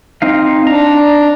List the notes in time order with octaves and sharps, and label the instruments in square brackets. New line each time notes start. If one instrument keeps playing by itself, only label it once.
[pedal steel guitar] C4 D#4 F5
[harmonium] D4 [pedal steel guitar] A#5